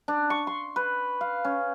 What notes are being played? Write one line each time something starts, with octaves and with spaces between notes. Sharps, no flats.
D4
C#6
C6
B4
F5
C#4